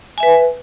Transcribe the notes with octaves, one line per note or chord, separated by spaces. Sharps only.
B4 E5 G#5